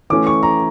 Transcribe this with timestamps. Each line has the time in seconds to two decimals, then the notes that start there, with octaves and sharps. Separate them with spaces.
0.10 E3 A3 C#4 D6
0.27 C#6
0.43 A#5